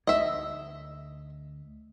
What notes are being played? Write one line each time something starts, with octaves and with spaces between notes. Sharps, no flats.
D2 D#5 E5